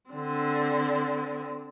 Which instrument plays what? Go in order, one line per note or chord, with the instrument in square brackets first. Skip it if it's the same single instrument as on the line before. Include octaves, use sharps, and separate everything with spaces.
[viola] D3 C4